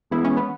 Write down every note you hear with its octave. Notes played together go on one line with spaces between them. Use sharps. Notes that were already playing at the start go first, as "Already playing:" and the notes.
E3 G#3 B3 E4
C#4
B3